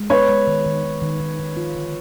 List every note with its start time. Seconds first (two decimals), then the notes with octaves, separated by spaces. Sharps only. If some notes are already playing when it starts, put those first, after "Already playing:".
Already playing: G#3
0.10 B3 B4 C#5
0.29 G#3
0.47 D#3
0.66 D#3
0.84 D#3
1.02 D#3
1.20 D#3
1.39 D#3
1.57 F4
1.75 D3